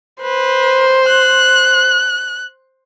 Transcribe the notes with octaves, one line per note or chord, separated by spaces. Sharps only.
B4 C5
F#6